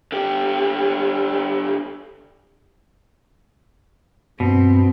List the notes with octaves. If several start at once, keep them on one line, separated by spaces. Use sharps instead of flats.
D3 G4
G2 B2 C4